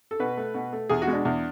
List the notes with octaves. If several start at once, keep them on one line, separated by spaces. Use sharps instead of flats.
A4
B2 B4
A3
B2
A3
E2 G#4
F#4
B2 G#3
D4
E2